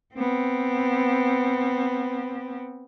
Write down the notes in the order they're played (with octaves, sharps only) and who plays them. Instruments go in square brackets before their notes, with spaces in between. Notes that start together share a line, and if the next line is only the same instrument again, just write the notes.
[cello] B3 C4